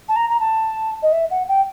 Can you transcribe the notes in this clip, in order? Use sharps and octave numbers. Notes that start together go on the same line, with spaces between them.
A5
A#5
A#5
A5
D#5
E5
F#5
G5